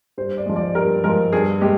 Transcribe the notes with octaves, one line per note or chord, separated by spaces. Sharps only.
G2 C5
D5
F3 G#3
D5
G2 A#4
F3 G#3 A#4
G2 G#4
G#3 G4